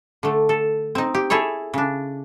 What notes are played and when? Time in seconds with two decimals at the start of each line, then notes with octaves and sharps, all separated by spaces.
0.23 D3 A3
0.49 A4
0.95 C4 D#4
1.14 G4
1.30 E4 G#4 A4 C#5
1.74 C#3 D4